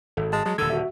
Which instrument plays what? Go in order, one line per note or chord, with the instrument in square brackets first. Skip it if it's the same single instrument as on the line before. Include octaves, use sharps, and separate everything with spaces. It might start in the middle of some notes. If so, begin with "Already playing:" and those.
[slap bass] G#1 [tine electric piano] A4
[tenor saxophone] G#3 [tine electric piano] A5
[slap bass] F#3 [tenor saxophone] G#3
[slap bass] D#1 D3 [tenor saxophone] A4 [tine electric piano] E6 G#6
[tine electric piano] F#4 E5